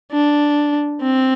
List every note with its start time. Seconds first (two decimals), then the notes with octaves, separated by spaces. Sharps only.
0.12 D4
1.02 C4